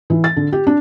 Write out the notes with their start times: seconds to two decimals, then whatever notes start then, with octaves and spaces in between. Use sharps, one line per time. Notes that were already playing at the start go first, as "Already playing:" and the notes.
0.10 E3
0.24 A6
0.37 D3
0.52 G4
0.67 D4